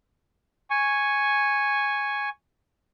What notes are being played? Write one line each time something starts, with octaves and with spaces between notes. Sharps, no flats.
G#5 C#6